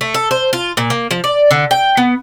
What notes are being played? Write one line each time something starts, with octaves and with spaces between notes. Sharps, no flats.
A3
A4
C5
F4
A#2
A#3
F3
D5
D3
G5
B3